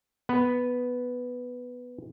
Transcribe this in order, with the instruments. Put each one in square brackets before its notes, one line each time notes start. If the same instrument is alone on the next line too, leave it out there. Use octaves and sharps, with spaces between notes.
[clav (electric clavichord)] B3 B4